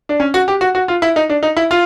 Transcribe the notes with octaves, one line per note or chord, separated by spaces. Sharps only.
D4
C#4
F#4
G4
F#4
F#4
F4
E4
D#4
D4
D#4
E4
F4